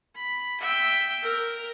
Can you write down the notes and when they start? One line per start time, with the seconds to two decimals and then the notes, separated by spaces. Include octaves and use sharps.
0.15 B5
0.60 E5 G5
1.22 A#4